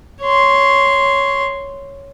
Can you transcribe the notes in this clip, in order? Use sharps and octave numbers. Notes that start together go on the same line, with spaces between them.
C#5 C6